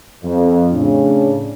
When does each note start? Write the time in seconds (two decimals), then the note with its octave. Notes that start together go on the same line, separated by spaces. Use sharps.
0.24 F2
0.73 A2 C#3 D4